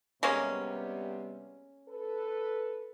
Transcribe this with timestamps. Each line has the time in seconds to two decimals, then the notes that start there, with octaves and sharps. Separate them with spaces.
0.23 C3 G3 G#3 A#3 B3 C#4
1.89 A4 B4